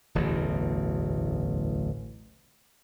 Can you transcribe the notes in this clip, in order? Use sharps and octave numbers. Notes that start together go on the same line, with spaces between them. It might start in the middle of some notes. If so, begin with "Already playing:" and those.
D1 A1 E2 B2